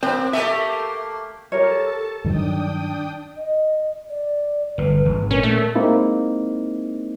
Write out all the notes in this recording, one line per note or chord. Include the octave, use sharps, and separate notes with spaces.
A#3 C4 C5
A3 A#3 G4 E5
G4 A4 A#4 C#5 A5
G2 D#3 F#3 D4 G5 D#6
D#5
D5
G1 A2 B4
G#1
A#2 C#4 A#4
A3
G#3 A#3 C4 D#4 E4